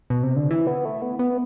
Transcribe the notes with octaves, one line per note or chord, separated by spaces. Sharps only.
B2
C3
D3
E3
B3
A3
B3
B3